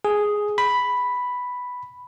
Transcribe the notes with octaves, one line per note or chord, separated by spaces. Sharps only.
G#4
B5